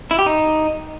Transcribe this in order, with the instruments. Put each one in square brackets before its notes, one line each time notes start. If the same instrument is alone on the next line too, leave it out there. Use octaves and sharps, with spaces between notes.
[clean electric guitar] E4
G4
D#4